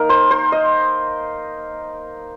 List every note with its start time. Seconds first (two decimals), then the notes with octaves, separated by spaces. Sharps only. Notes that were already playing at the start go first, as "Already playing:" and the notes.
Already playing: A#3 D#4 A#4
0.09 C5
0.31 C5
0.52 D#5